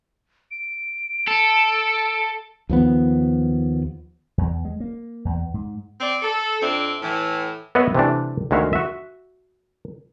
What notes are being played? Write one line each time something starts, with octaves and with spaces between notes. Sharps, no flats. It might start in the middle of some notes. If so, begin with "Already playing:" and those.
D7
A4
D#2 F3 B3
E2
G#3
A#3
E2
G#2
C4 D5
A4
F2 C4 D4 E5
A2 E3
B3 B4 C#5 D#5 E5 F#5
C3 E3 A3 D4
D2 D#3 G#3 F#4 E5 F5
F#4 E5